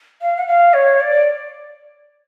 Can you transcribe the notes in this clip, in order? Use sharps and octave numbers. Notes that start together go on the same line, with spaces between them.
F5
F#5
F5
C#5
D5